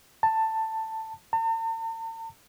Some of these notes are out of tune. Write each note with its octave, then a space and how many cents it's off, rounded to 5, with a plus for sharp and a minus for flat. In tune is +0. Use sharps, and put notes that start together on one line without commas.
A5 +10
A5 +45